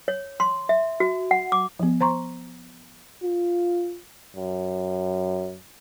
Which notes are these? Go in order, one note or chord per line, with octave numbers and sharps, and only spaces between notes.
C#5
C6
E5
F#4
F#5
D6
F3 B3
C5 A#5 C6 C#6
F4
F#2